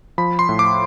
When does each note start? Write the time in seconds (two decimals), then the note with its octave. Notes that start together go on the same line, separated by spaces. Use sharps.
0.18 F3 B5
0.39 C6
0.49 A2
0.59 D6